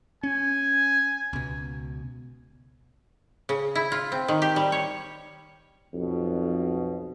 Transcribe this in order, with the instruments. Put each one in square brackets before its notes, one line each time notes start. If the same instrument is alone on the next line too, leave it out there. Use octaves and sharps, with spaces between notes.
[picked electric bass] C#4 [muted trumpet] G#5
[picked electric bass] C#2 B2
[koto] C#3
E4
F4
C4
D#3
G4
G3
C#5
[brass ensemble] B1 F2 B2